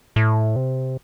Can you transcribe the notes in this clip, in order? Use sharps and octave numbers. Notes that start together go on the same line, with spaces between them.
A2
C3